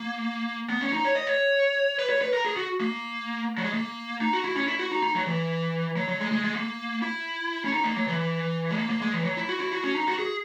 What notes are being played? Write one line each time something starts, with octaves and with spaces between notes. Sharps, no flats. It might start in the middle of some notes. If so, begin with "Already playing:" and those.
Already playing: A#3
B3
C#4
D#4
C#5
D#5
C#5
B4
C#5
B4
A#4
G#4
F#4
A#3
F#3
G#3
A#3
D#4
F#4
E4
C#4
E4
F#4
D#4
D#4
F#3
E3
F#3
F#3
G#3
G#3
G#3
A#3
E4
C#4
D#4
A#3
F#3
E3
G#3
A#3
A#3
G#3
E3
F#3
E4
F#4
E4
F#4
C#4
D#4
F#4
G#4